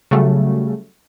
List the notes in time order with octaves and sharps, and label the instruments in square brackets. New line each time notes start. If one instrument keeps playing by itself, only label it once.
[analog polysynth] C#3 F#3 G3 A3